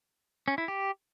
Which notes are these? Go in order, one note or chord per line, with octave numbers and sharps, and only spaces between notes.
C#4
E4
G4